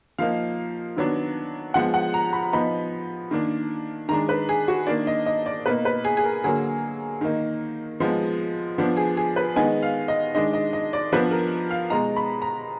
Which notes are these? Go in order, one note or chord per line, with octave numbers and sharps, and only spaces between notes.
F3 A#3 D#4 F5
D#3 F#3 B3 D4
F3 G#3 B3 F#5
F#5
A#5
B5
F3 B3 D#4 B5
D#3 A#3 D4
D#3 G#3 D4 A#5
B4
G#4
F#4
D#3 A#3 D4 D5
D#5
D#5
D5
B2 A#3 D#4 B4
B4
G#4
G#4
A#4
D3 F#3 A#3 G#4
D#3 A#3 D#4
F3 G#3 B3 D#4
F3 B3 D4
G#4
G#4
B4
D#3 G#3 B3 D#4 G#5
F5
D#5
D#3 G#3 D4 D#5
D#5
D#5
D5
F3 B3 D4 B4
A#4
F5
B2 G#3 D#4 A#5
B5
A#5